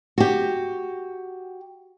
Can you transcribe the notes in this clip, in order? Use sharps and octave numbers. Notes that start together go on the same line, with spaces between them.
F#4 G4